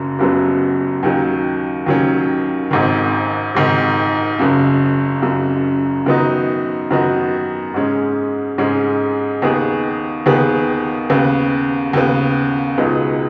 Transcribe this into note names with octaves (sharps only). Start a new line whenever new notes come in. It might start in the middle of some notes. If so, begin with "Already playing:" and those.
Already playing: F#1 F#2 C#3 F#3
F#1 F#2 C#3 F#3 B3
D#2 D#3 F#3 C#4
D#2 D#3 F#3 C#4
G#1 G#2 D#3
G#1 G#2 D#3
F#1 F#2 C#3
F#1 F#2 C#3
F#2 D#3 B3 D#4 F#4
F#2 D#3 B3 D#4 F#4
G#2 G#3 C#4
G#2 G#3 C#4
D#2 D#3 B3 G#4
D#2 D#3 B3 G#4
D#2 C#3 B3
D#2 C#3 B3
C#2 B2 G#3 B3 D#4